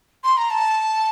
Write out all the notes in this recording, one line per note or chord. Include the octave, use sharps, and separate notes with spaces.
C6
A#5
A5